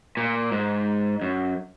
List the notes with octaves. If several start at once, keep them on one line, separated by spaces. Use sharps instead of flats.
A#2
G#2
F#2